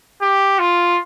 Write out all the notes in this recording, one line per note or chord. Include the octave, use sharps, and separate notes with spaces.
G4
F4